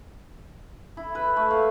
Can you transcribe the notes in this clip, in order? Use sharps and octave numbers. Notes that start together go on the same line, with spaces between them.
E4
B4
A3
F5